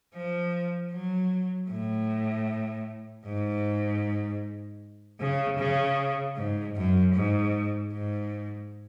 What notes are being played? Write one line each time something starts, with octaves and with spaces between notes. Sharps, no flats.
F3
F#3
A2
G#2
C#3
C#3
G#2
F#2
G#2
G#2